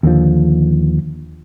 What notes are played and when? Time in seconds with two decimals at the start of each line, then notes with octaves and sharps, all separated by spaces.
0.03 D#2 D3 F3